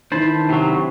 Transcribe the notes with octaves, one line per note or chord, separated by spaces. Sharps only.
D#3 D4 E4 C5 A5 B5
C3 F#3